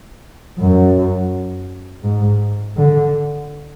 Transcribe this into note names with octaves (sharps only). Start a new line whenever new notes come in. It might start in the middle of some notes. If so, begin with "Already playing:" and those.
F#2
G#2
D3